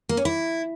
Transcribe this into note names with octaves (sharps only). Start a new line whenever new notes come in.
A#3
C#4
E4